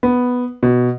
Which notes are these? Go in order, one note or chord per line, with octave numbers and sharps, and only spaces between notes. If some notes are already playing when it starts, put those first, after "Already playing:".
B3
B2